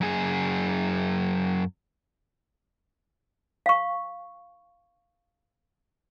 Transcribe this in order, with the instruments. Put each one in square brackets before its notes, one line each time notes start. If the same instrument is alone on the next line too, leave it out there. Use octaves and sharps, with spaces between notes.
[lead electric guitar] F#2 G#4
[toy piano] F5 C#6